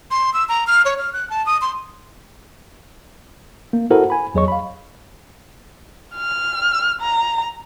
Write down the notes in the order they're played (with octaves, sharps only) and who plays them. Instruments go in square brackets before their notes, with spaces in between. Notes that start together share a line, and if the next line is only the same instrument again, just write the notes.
[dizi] C6
E6
A#5
F6
C#5
F6
F#6
A5
D#6
C6
[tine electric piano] A#3
E4 F#4 A4 A#4 C5 F#5
G#5 B5
E2 F#3 G#4 C#5 D#5 C#6
F5 B5
[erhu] F6
A#5